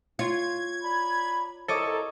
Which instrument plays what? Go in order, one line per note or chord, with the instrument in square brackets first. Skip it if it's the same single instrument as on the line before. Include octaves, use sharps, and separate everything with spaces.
[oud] F4 [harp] C#5 [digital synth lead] G#6
[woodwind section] D5 A#5 B5
[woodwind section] C2 A#5 [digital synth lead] A4 [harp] C#5 D#5 D6